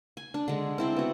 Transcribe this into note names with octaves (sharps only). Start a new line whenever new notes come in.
G#5
D4
D3 G#3
C4 E4 D5
B3 F#4